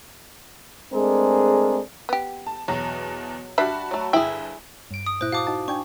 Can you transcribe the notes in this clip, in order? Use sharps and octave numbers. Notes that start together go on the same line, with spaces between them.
G#3 A3 C4 D4 G#4 A#4
B3 G4
A5
E2 B2 F#3
G3 D4 F#4 E5 A5 B5
F#3 A3
G1 E4 G#4 G5
G2 D7
D#6
A#2 E4 C5 F#6
F#4 F5 A5 D6 D#6
D#4 F#4 A5
D4 G5 G#5 C#6